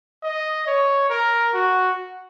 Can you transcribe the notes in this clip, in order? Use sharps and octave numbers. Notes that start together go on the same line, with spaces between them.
D#5
C#5
A#4
F#4